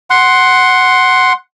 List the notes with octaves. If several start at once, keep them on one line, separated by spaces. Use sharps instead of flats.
F#5 C6